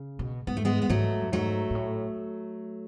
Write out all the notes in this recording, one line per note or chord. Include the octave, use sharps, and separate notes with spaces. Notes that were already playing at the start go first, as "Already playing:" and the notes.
Already playing: C#3
B2
G#2 B3
A3
G#3 B3
B3
G#2 F#3 A3
F#2
G#2 F#3 A3
G#2
A2